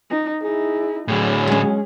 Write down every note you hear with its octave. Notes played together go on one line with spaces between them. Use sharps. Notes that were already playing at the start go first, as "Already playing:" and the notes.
D#4
D#4 E4 G#4
A2 D3 F#3 G#4
G#3 C#4